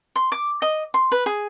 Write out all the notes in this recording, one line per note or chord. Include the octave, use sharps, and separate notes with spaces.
C6
D6
D#5
C6
B4
G#4